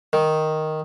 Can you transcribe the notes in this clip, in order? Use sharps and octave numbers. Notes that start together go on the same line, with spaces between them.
D#3